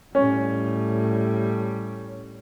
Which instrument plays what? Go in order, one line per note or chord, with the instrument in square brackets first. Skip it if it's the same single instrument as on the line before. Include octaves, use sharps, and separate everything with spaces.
[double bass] A2 G3 [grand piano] C#4